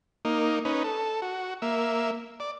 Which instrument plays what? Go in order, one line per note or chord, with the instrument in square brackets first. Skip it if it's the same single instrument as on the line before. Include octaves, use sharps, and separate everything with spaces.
[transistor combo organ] A#3 D#4
C#4 D#4 B4
A4
F#4
A#3 E5
D5